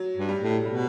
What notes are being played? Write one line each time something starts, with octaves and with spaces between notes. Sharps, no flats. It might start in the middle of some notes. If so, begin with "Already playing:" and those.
Already playing: F#3
G2
G3
A2
B2 G3